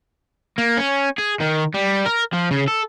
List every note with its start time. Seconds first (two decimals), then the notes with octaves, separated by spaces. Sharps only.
0.58 A#3
0.77 C#4
1.18 G#4
1.40 D#3
1.74 G3
2.06 A#4
2.33 F3
2.51 C#3
2.68 A4